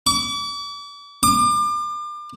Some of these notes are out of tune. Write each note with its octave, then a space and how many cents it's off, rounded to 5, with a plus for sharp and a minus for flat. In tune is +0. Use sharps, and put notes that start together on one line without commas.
D6 -40
D6 +35